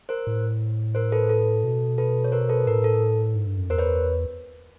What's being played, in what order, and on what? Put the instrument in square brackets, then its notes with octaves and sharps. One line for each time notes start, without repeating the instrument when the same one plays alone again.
[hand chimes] A#4 C5
[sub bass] A2
[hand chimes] A#4 C5
A4 B4
A4
[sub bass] B2
[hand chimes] A4 B4
C#5
A#4 C5
A4 B4
[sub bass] A2 [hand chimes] A#4
[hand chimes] A4
[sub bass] G#2
G2
F#2
[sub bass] E2 [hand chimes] A#4 C5
[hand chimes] B4 C#5